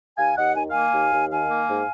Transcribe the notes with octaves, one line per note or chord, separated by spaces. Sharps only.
D#2 F5 G#5
D#2 D#5 F#5
D#3 G#5
A#3 F5 G#5
D#2
D#2
D#3 F5 G#5
A#3
G#2